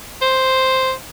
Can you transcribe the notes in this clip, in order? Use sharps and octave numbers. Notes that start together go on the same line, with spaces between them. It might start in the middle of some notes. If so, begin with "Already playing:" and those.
C5